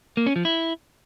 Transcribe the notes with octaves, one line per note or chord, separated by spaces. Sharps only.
A#3
C#4
F3
E4